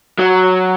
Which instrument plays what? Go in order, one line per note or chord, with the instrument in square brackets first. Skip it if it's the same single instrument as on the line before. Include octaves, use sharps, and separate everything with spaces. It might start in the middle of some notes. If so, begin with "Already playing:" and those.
[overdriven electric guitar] F#3